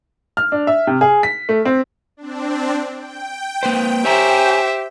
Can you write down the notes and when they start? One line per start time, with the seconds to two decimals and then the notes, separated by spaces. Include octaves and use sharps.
0.37 F6
0.52 D4
0.67 E5
0.87 C3
1.01 G#4
1.23 B6
1.49 A3
1.65 C4
2.17 C4 D4
2.97 G5
3.63 A#3 B4 C5
4.05 G4 C5 C#5 E5 G#5 A#5